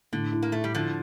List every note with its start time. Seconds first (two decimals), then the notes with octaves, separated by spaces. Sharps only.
0.12 A2 D3
0.33 E4
0.42 A#3
0.52 A3 E4
0.64 G3
0.75 D3 F3 E4